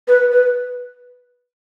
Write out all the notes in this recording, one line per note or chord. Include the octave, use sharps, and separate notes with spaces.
B4
B4